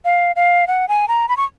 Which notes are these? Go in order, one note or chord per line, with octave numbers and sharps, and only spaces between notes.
F5
F5
F#5
G#5
A#5
B5
C#6